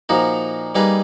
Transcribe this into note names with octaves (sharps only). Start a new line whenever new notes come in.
A#2 F3 A#3 D#4 F#4
G3 A#3 D#4 G#4 B4